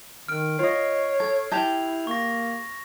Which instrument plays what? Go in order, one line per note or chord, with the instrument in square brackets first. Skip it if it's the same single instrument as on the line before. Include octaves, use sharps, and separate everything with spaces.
[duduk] D#3 [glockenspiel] F6 D7
[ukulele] F4 D#5 [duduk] C#5 [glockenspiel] C7
[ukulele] A4 [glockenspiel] G#6
[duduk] E4 [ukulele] G4 A5 [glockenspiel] G#6 F7
[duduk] A#3 [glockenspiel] C#6 A#6